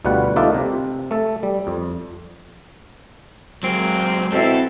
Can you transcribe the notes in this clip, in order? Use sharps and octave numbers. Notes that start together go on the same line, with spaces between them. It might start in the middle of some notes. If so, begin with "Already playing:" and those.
D2 B2 G3 F4 B4 F#5
A3 A#3 D#4 F4 D5 E5
C3
A3 A4
G3
F2
F#3 G#3 A#3 C4
B2 C4 E4 A4